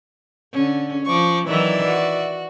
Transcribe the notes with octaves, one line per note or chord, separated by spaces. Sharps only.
D3 C#4
F3 C#6 D6
D#3 E3 F#3 D5 E5
F#4